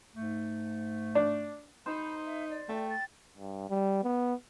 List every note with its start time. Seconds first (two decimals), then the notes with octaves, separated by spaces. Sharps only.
0.16 G#2 A3
1.15 D4
1.86 D#4 C5 B5
2.26 E5
2.50 D5
2.69 A3 G5
2.89 A6
3.38 G2
3.70 G3
4.04 B3